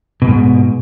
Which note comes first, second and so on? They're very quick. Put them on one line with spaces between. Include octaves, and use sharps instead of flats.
B2 F2 G#2